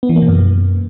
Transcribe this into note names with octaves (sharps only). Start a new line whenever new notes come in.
B3
E3
A#3
B2
F#2